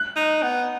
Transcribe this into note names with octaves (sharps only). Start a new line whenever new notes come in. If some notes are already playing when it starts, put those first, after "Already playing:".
Already playing: F#6
D#4
B3